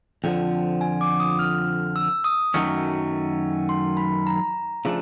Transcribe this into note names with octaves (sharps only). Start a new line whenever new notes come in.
F2 D3 F3 G5
G#5
D6
D#6
F6
E6
D#6
F#2 D#3 F#3 A3 C#4 C#6
C6
B5
A#5
C#3 F3 A3 D4